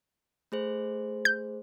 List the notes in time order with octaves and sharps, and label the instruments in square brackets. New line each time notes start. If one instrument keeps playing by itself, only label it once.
[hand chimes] A3 G#4 C5
[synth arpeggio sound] G6